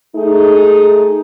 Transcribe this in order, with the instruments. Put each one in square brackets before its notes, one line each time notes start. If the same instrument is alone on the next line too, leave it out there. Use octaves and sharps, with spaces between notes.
[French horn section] A3 D#4 G#4